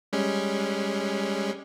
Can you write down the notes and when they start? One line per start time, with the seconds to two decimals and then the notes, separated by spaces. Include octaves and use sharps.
0.13 G3 G#3 C#4